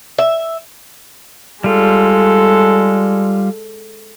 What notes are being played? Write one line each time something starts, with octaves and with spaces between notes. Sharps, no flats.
E5
G3 G#3 F4 A4